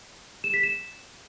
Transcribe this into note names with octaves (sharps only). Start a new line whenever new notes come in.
E7
B6
E7